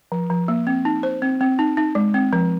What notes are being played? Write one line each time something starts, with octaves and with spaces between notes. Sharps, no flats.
F3
F3
A#3
C4
D#4
C5
C4
C4
D#4
D#4
G#3
C4
F3